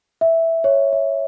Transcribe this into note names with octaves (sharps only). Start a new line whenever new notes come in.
E5
C#5
E5